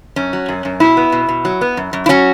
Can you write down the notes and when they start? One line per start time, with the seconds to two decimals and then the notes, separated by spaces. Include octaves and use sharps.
0.16 F#2 C#4
0.33 F#3
0.49 F#2
0.65 F#2
0.80 B2 E4
0.97 B3
1.12 B2
1.29 B2
1.45 F#3
1.61 B3
1.77 F#2
1.93 F#2
2.06 E4
2.09 F#3 C#4 F#4